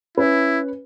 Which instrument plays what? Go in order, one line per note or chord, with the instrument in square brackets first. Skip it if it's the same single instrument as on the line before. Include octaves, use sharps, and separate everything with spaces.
[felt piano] C#4 B4 [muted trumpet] E4